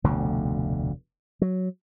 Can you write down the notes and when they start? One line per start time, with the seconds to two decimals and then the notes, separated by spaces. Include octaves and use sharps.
0.04 F1 D2 B2 D3
1.42 F#3